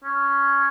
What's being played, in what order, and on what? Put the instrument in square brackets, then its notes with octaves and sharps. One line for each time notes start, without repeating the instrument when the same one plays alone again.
[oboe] C#4